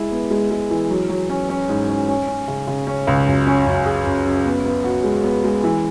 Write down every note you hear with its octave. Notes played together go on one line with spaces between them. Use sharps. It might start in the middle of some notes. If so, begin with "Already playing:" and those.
Already playing: G#3 E4
B3
G#3
G#3
E3
F#3
F#3
C#4
C#4
G#2
C#4
C#4
C#4
C#3
C#3
C#4
C#2
F#2
C#4
F#2
G#4
F#2
F#2
B3
B3
F#4
G#3
B3
G#3
E3